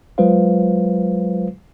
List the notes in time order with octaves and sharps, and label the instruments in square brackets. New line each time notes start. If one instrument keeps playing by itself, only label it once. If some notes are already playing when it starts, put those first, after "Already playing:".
[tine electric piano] F#3 G#3 F4 B4 C5 F5